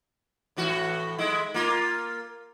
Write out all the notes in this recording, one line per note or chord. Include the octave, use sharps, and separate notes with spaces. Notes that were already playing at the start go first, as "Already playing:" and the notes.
A2 E3 F#4
G#3 E4
A#3 F4